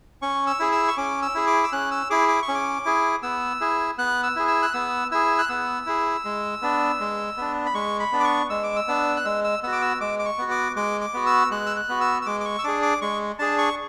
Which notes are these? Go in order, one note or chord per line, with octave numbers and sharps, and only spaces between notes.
C#4 C#6
E6
E4 G#4
E6
C#6
C#4 D6
E6
E4 G#4
D6
E6
C#4 F#6
E6
E4 G#4 D6
D6
C#6
C#4
D6
E4 G#4
B3 E6
E4 G#4
B3 F#6
E6
E4 G#4
E6
F#6
B3 E6
E4 G#4 E6
F#6
B3 E6
E4 G#4
G#3
B3 D4
G#3
B3 D4
B5
G#3 C#6
B5
B3 D4
D6
C#6
G#3 E6
D6
E6
B3 D4
F#6
G#3 E6
E6
B3 F#4 E6
D6
E6
G#3 D6
D6
C#6
B3 F#4
D6
G#3 D6
D6
B3 F#4
E6
G#3 F#6
E6
F#6
B3 F#4
E6
E6
G#3 D6
D6
C#6
E6
D4 G#4 D6
D6
G#3 C#6
D4 G#4 A5
C#6